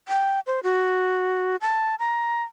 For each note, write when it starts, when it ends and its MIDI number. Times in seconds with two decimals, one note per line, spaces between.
0.08 0.40 79
0.47 0.60 72
0.63 1.56 66
1.61 1.95 81
1.99 2.43 82